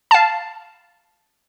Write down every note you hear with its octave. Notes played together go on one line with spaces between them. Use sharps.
F5 A5